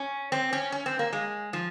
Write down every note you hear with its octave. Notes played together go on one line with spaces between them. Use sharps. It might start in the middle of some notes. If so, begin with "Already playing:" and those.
Already playing: C#4
C4
C#4
C#4
C4
A#3
G#3
F3